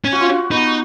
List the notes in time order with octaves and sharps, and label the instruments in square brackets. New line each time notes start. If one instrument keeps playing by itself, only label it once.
[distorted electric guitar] C#4
[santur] F#4
F4
F#4
[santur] B3 [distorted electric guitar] D#4